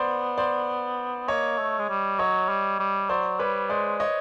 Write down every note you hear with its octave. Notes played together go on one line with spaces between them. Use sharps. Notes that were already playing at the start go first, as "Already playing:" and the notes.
Already playing: B3 C5 D5
C5 D5
A#3 C#5 D#5
A3
G#3
G3
F#3 C#5 D#5
G3
G3
F#3 C5 D5
G3 B4 C#5
G#3 C5 D5
C#5 D#5